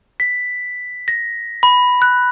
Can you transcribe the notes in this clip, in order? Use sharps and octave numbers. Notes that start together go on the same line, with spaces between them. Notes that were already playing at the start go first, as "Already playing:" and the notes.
B6
A#6
B5
F#6